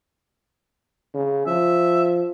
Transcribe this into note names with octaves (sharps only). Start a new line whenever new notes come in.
C#3
F3 E5